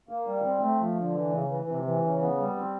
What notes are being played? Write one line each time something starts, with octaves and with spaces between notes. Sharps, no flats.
A#3
G3
C4
A3
F3
D3
E3
C#3
E3
C3
E3
C#3
B3
G3
C4